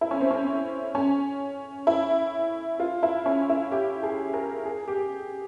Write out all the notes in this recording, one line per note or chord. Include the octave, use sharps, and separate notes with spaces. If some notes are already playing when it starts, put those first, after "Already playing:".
E4
C#4
C4
C#4
C#4
E4
F4
E4
C#4
E4
G4
G#4
A#4
G#4
G4